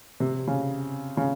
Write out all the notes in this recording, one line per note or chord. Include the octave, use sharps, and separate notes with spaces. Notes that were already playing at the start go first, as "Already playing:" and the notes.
C3
C#3
C#3